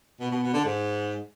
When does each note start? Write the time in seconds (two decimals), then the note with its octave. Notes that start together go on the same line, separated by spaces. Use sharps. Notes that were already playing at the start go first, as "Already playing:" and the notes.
0.20 B2
0.31 B2
0.42 B2
0.53 D3
0.65 G#2